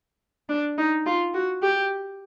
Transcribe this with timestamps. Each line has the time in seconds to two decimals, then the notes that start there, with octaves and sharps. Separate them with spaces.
0.49 D4
0.78 D#4
1.06 F4
1.34 F#4
1.62 G4